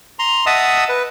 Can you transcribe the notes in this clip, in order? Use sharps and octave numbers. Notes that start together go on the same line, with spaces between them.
A#5 C6
D#5 E5 F#5 A5 D#6 E6
B4